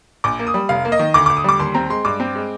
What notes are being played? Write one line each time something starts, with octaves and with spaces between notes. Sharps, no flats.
A#1 D6
A#3
D#6
G3
F1 F5
A#3
D#5
D#3
D2 D6
D2 D6
D#6
G3 D6
D#2 C6
C4 A#5
G#3 C6
G2 D6
C4
G#3